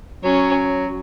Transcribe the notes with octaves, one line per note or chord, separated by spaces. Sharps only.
F#3 C#4